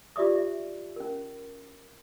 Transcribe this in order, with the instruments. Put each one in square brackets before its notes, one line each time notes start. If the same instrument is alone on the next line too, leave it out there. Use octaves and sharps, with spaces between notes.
[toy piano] F4 G4 D5 E5 D6 D#6
E5
C#4 A#4